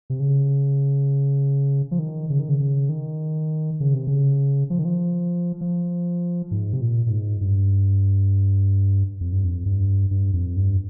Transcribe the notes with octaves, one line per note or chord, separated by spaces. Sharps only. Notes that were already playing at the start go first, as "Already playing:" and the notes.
C3
C#3
F3
D#3
C#3
D#3
C#3
C#3
D#3
C#3
C3
C#3
F3
D#3
F3
F3
G#2
C3
A#2
A#2
G#2
G2
F2
G2
F2
G2
G2
F2
G2